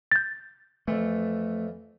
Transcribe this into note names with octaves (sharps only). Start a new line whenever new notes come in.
G6 A6
F2 E3 A3